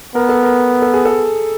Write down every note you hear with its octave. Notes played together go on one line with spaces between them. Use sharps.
B3 A#4
A4
A#4
A4
G#4
A4